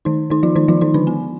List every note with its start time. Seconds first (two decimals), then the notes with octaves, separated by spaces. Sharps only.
0.05 D#3 D#4
0.30 D#3 D#4
0.43 F3 F4
0.55 D#3 D#4
0.68 F3 F4
0.81 D#3 D#4
0.94 D3 D4
1.07 B3